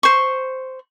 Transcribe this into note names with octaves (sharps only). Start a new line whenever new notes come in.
C5 C#6